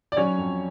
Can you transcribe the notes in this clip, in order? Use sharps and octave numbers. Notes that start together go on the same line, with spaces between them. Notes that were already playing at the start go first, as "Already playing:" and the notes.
D5
F#3 C#4 C#5
F2